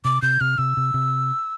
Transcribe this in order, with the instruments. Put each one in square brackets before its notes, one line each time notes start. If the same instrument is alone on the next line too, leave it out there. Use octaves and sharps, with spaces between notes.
[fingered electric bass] C3 [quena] D6
[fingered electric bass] C3 [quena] G6
[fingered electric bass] C3 [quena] F6
[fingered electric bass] C3 [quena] E6
[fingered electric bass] C3
C3